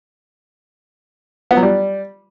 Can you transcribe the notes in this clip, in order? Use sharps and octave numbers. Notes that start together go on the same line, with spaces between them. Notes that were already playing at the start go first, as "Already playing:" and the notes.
B3
F#3
G3